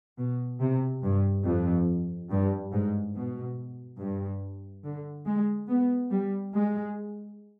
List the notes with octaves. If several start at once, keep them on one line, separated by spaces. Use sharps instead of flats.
B2
C3
G2
F2
G2
G#2
B2
G2
D3
G#3
B3
G3
G#3